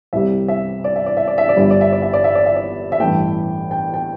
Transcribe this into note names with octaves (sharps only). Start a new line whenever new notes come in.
C2 C3 G3 E5
E5
D5
E5
D5
E5
D5
E5
D5
G1 G2 G3 E5
D5
E5
D5
E5
D5
E5
D5
E5
D5
E5
A1 G2 E3 A3 G5
G5
G5